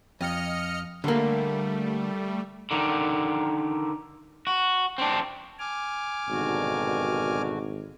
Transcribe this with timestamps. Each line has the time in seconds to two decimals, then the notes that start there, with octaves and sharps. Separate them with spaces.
0.21 F2 D#5 F6 C#7
1.04 D3 G3 A3 A#3
2.71 D3 D#3
4.47 F#4
4.98 C4 D4
5.59 G#5 D6 F6
6.29 G#1 G2 B2 D3 D#3 F#4